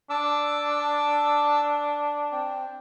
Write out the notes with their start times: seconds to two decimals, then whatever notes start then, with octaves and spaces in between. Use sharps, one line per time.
0.10 D4 A5 D6 E6
2.32 C4